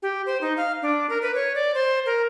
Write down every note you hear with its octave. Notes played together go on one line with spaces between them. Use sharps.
G4
C5
D#4
F5
D4
A#4
B4
C#5
D5
C5
A#4